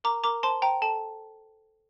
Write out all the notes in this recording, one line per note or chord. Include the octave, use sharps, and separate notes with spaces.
A#4 A#5 D6
A#4 A#5 D6
C5 A5 C6
C5 G5 A#5
A4 A5